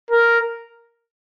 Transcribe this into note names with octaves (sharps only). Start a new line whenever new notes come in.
A#4